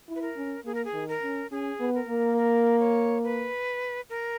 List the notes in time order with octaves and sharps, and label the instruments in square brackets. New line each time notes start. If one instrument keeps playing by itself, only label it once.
[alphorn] E4
[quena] B4
A#4
[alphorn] C#4
[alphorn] A#3 [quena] G#4
[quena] A#4
G#4
[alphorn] D#3
[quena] A#4
[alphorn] C#4
[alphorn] C#4 [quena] G#4
[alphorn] B3
[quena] A#4
[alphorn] A#3
[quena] A#4
C#5
B4
A#4